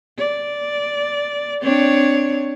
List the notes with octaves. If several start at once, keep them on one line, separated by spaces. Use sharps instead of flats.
D5
C4 D4 C#5